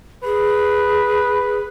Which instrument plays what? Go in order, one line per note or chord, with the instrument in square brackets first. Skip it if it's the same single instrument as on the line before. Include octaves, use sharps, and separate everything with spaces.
[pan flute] G#4 [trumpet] B4